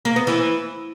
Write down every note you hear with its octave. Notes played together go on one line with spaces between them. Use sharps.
A#3
B3
E3